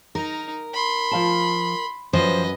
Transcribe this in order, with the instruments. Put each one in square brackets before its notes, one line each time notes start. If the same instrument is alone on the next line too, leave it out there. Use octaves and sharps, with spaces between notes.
[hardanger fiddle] D#4 [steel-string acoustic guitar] A#4
[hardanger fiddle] B5 C6
[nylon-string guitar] F3 F5 A5
[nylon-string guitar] F#2 [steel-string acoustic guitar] F3 C5 [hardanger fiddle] B4 D#5